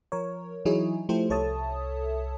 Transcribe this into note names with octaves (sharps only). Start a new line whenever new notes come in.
F3 A#4 C#5
E3 F#3 D#4 E4 G#4 C#5
F3 A3 E4 G4 A4 C5
C2 A4 C#5 E5 A5 D#6